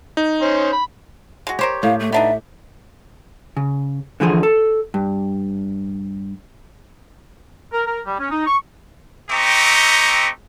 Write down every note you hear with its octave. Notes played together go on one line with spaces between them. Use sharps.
D#4
C#4 C5
B5
G#3 F#4
G4 A#4 C5 C#5
A2 F5
A3
B3 D4 D#4 E5
C#3
D3 E3 F3 G#4
A4
G2
A#4
A#4
G3
C#4
D#4
C#6
A3 C4 G4 D#5 A#5 C#6